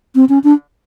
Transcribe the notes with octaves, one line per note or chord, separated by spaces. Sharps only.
C4
C#4
D4